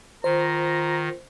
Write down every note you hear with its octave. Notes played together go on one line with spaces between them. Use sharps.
D#3 F4 C5 A#5